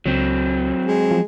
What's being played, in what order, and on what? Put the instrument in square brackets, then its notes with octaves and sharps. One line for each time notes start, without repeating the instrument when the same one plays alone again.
[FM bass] C#2 [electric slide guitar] F#3 C4
[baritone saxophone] G#3
[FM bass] F3